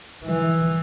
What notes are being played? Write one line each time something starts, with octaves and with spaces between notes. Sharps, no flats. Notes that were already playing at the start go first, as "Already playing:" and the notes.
E3